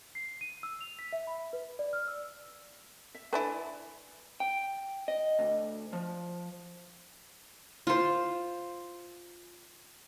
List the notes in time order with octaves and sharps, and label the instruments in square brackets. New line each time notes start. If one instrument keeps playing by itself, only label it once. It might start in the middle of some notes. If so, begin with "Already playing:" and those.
[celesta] C7
D#7
E6
F7
B6
E5
B5
B4
D5
F6
E6
[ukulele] E5
[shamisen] D3 A3 E4 [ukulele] B4 D5 G#5
[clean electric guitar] G5
D#5
D2
F3
[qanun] F4 C5